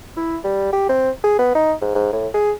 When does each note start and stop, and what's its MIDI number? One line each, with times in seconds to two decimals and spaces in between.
0.17 0.38 64
0.44 0.69 55
0.73 0.85 67
0.89 1.10 60
1.24 1.35 68
1.39 1.54 59
1.55 1.73 63
1.82 1.90 44
1.95 2.12 44
2.13 2.28 45
2.34 2.52 68